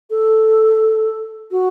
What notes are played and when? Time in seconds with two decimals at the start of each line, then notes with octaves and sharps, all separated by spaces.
0.10 A4
1.51 F#4